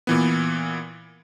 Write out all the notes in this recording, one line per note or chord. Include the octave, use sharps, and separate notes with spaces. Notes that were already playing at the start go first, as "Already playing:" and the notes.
A#2 E3 B3